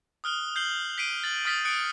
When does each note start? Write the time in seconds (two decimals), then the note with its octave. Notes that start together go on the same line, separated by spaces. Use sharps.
0.24 D#6 F6 F#6 G7
0.56 G6 C7 F#7 G7
0.98 B6 C7 D7 D#7
1.24 A6 F#7
1.45 D#6 F6 A6 B6 D7
1.65 D#6 F#6 C#7 D7